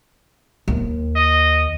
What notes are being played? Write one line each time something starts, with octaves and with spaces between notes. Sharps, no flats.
D#2
D#5